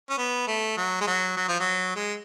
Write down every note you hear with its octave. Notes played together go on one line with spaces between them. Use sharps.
C#4
B3
A3
F#3
G#3
F#3
F#3
F3
F#3
G#3